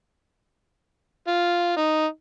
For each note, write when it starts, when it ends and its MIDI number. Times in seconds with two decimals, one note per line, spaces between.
1.27 1.73 65
1.77 2.06 63